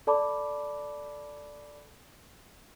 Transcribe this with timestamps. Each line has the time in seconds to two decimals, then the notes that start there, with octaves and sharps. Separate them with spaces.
0.07 A4 D5 A5 B5 D6